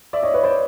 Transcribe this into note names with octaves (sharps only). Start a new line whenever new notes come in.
D5 E5
C#5 D#5
B4 C#5
C5 D5